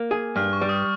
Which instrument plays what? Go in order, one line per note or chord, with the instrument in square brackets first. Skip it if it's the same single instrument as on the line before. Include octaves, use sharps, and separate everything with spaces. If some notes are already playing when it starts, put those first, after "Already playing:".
Already playing: [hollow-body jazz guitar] A#3
G#4
[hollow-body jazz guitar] G2 [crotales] F6
[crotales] C#6
[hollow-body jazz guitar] G3
[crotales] D#6